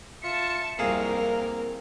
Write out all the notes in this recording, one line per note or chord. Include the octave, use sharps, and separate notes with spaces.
F4 E5 A5 C#7
C2 F2 A#3 C4 G#4 A#4 F5